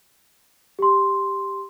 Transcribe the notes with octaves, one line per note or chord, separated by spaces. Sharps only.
G4 C6